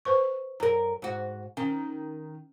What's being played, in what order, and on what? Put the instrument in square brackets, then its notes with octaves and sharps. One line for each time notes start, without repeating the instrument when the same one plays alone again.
[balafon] B4 C5 C#6
[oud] F#2 A#4 [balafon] A#5
[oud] G#2 F#4
[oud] D#3 [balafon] C#4